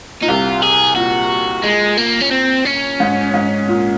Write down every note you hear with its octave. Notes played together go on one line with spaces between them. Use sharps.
A#2 D#4
C2 C3 F4
G#4
A#2 F#4
G#3
A#3
C#4
C4
C#4
G#2
G#2
A#2